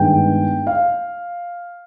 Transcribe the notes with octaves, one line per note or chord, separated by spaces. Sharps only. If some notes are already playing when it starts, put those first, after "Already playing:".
Already playing: G2 D#3 G#3 B3 G5
F5